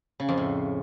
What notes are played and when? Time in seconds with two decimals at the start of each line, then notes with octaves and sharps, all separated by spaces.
0.20 C#3
0.29 F2
0.38 A2